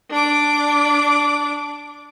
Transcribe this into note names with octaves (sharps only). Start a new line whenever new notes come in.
D4 D6